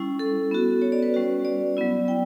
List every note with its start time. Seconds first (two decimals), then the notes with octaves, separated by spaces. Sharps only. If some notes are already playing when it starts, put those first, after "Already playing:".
Already playing: G3 C#4 E4
0.19 A4
0.51 B3 F#4
0.82 C#5
0.92 D5
1.03 B4
1.14 G3 C#4 F#4
1.45 D5
1.77 F#3 B3 E4
2.08 G5